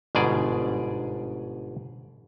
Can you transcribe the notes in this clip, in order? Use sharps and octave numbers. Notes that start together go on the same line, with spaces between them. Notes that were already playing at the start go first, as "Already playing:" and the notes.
G1 G#2 B2 G#4 D5